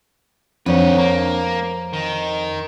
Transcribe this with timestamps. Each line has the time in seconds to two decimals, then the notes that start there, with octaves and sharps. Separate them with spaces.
0.66 F2 D#3 C4 D4 B4 C#5
0.98 A#3 A#5
1.93 D#3